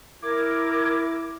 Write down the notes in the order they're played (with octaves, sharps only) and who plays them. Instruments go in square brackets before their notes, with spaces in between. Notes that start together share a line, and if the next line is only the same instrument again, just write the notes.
[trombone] E4 [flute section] A#4 G#6 [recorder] D6